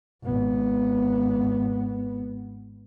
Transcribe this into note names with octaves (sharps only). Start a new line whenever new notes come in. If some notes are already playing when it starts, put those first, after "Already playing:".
G#1 B3